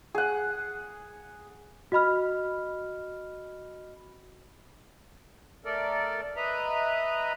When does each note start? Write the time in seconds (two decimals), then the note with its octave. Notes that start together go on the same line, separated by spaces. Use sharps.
0.15 G#4 F#5
1.92 F#4 D#5 B5 F6
5.65 A3 A4 A#4 D5
6.36 B4 D#5 E5 A#5 B5